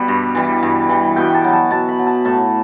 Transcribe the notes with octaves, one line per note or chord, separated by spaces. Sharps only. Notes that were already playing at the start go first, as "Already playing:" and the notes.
Already playing: B2 G3
G2
E3 G3
G2
E3 G3
B2 G5
A5
F#3
A5
B2 A5
B5
F#3
A5
A2 A5